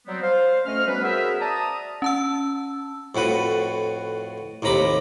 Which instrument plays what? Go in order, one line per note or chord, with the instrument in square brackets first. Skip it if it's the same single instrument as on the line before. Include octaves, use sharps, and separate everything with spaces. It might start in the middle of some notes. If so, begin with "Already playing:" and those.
[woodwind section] F#3 G3 B3 C4
C5 F5
D2 A3 C#4 D#5 F6
F#3 G3 B3 C#4 B4
F#4 G#4 A#4 C5 E5
D5 A5 A#5 D#6
[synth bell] C#4 A5 E6
[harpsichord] F2 A2 F#4 B4
A1 D#2 C3 A#5 B5 D6